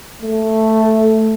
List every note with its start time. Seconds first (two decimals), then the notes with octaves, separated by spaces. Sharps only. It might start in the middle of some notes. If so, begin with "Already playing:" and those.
0.22 A3